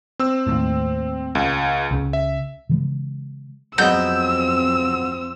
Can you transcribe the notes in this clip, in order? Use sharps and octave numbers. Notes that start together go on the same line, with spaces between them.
C4 E6
D#2 A2
C#2
C#2 C#3
E5
C#3 E3 G#3
F2 F#3 G#3 B3 C4 E6 G6